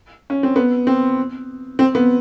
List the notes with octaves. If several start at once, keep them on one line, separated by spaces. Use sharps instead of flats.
C#4
C4
B3
C4
C4
B3